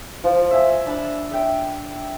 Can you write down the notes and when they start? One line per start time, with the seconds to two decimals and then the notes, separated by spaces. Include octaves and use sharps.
0.24 F3
0.51 E5 G#5
0.86 D4 A5 B5 E6
1.31 E5 G5